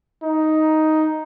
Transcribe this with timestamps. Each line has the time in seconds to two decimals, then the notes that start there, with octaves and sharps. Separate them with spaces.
0.23 D#4